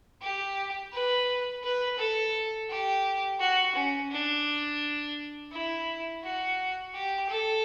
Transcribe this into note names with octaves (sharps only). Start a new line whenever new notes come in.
G4
B4
B4
A4
G4
F#4
C#4
D4
E4
F#4
G4
A4